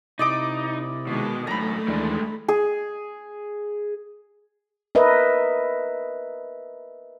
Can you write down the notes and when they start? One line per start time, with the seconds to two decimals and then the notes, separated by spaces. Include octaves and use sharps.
0.19 C3 D#4 E4 D5 D#5 D6
1.07 B2 D#3 G#3
1.47 F#2 A2 A3 A#5 B5
1.88 D#2 E3 G3 G#3 D4
2.48 G#4
4.95 A#4 B4 D#5 E5